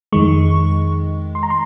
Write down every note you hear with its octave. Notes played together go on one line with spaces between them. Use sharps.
F2 D#3 G#3 C#6
C6
A#5
C6